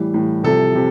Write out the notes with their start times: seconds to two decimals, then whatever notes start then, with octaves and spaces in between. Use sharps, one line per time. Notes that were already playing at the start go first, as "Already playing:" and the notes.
Already playing: A2 E3 G3
0.14 A2 E3 G3
0.43 C2 C3 F3 A4
0.75 C3